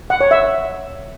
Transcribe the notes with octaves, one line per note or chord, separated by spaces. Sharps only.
F#5
C#5
E5